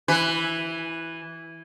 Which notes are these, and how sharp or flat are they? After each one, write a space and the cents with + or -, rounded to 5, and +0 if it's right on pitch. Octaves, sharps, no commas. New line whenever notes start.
E3 +0 B4 +0